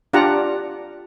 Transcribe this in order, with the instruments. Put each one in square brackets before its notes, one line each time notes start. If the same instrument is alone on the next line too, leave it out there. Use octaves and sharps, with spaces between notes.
[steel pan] D4 F4 G4 D5 F#5 A#5